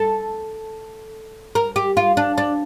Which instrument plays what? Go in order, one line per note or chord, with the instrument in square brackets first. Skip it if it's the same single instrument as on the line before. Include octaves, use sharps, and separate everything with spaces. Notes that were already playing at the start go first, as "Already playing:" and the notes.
Already playing: [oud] A4
A#4
G4
F4
D4
D4